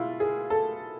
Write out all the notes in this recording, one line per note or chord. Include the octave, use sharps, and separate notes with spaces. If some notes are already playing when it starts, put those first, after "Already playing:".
Already playing: B2 G#3 E4 F4
G#4
A4